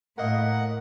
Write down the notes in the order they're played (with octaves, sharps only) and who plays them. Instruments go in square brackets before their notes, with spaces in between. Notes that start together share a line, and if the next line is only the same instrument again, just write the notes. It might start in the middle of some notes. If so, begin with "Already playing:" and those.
[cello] A2 [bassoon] A#3 [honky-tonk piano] A#4 D#5 F5 [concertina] F#5